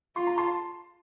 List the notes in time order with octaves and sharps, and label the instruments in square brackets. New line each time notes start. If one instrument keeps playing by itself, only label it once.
[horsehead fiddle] F4 [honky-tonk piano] C6
[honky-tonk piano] A#5
A5 C6